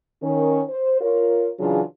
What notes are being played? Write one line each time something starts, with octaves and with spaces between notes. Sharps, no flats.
D#3 C#4
C5
F4 A#4 C#5
C#3 E3 F#3 D4 F4 G#4